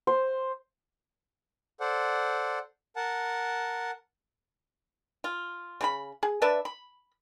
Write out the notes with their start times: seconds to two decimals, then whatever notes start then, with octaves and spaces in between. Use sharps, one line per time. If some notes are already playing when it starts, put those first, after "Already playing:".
0.07 C5
1.80 A4 C5 D5 F#5
2.96 A#4 F#5 A5
5.24 F4
5.81 C#3 F4 B5
6.23 G#4
6.42 D4 B4 D5 E5
6.65 B5